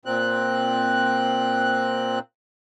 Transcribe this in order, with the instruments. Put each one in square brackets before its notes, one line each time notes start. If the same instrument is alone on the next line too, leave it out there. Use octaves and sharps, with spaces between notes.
[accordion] A#2 C4 F#6